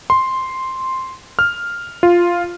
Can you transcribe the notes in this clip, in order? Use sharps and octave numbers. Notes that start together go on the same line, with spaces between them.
C6
F6
F4